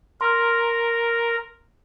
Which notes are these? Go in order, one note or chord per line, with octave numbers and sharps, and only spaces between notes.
A#4 C6 F6